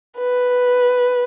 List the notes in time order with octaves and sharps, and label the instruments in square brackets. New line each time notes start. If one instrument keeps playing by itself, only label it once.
[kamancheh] B4